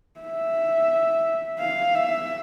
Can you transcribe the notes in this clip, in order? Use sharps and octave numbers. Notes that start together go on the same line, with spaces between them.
E5
F5
E5